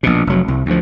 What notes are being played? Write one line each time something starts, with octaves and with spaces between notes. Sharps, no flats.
A#1 B2
F1 F#3
C2
D2 F3